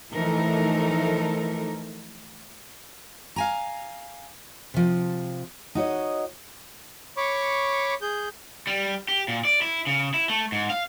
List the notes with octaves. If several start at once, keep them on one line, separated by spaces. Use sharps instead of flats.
E3 F3 A3 D#4 A4 A#4
F5 G#5 A#5
C3 F3
D#4 F#4 C#5 D#5
C#5 B5 C#6 D6
G#4 G6
G3
G4
A#2
D5
E4
C#3
E4
A3
G#2
F5